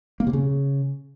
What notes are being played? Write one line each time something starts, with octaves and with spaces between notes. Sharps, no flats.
A#3
C3
C#3